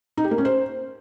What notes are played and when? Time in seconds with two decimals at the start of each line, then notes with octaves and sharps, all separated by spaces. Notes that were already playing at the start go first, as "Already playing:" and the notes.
0.17 D#4
0.24 G4
0.31 A#3
0.38 C#4
0.45 C5